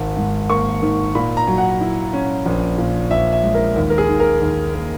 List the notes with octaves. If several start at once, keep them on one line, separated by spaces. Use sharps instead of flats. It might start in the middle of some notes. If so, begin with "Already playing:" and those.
Already playing: G#1
G#2
A#3 C#6
D#3
A#2 B5
A#5
F#3
F#5
E4
C#4
A#1
A#2
A#1 E5
E5
G#3
A#4
D#2
A#4
G#4
D#3
A#4
D#2
A#3